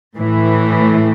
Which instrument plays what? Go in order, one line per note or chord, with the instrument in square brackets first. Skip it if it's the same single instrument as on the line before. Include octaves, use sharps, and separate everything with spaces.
[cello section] A2 E3